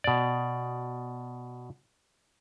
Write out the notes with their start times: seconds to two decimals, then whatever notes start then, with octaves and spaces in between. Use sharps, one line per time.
0.04 B2 D5